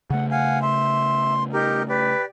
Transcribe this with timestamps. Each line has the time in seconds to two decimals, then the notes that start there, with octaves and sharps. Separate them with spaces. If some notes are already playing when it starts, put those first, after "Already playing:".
0.10 C#3 A3 F#5
0.31 F5 F#5 G#5
0.62 E5 C6
1.53 D#4 G4 A#4
1.89 G4 B4 D5